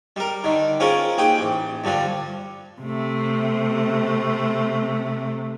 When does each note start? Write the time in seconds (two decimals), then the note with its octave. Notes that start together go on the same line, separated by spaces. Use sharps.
0.16 G3 A#4
0.44 D3 D#3
0.80 C4 C#4 F4 G#4 A#4
1.18 D#2 G4 G#4 G5
1.39 A1
1.84 G2 D3 F3 G3
2.81 C3 A3